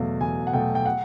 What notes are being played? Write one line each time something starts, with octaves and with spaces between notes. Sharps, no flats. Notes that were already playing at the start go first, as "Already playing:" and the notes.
Already playing: E2 B2 F#3 A3 F5
E2 G#5
F#5
B2 F#3 A3 G5
G5
F#5